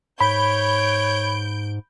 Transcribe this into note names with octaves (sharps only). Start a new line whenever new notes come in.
G#2 C#5 B5 G6 D7